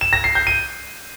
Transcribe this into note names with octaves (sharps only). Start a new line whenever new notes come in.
E7
A#6
C7
G6
D#7